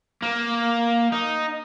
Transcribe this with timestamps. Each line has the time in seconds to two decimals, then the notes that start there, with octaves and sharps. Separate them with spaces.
0.22 A#3
1.12 D#4